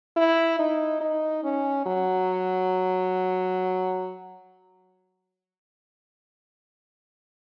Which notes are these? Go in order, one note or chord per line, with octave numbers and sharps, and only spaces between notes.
E4
D#4
D#4
C#4
F#3